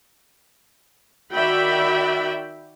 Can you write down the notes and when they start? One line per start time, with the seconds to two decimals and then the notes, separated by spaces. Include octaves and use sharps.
1.33 D#3 F#4 D5 E5 G5 B5